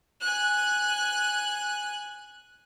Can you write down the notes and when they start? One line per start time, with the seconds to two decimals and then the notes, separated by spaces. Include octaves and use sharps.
0.21 G#5 F#6